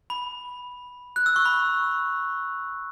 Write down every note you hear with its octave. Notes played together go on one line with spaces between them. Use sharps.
B5
F#6
E6
C#6
B5